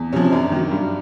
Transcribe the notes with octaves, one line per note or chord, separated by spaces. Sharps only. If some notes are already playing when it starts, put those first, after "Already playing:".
Already playing: E2
C3 F3 C#4
F#2 D4
D#3 F#3
G2